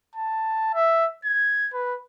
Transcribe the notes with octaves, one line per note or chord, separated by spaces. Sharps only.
A5
E5
G#6
B4